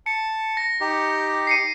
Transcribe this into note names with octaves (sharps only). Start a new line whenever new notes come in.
A5 C#7
A#6
D#4 G4
C7 C#7 D#7